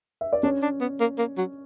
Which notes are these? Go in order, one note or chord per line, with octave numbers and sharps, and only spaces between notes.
E5
D5
C#4 D4 C#5
D4
B3
A#3
A#3
F#3